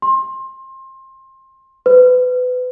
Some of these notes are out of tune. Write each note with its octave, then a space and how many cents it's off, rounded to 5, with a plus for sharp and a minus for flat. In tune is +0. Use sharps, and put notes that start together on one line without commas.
C6 +25
B4 +25